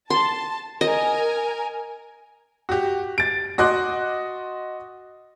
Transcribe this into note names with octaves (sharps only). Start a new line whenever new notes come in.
A5 C6
A#4 D#5 G#5
F#4 G4
A6 D7
F#4 D#5 C6 D6 F#6